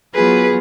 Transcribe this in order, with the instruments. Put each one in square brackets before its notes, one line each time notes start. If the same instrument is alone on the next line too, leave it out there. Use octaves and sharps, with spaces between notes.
[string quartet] F#3 B3 F4 G#4 B4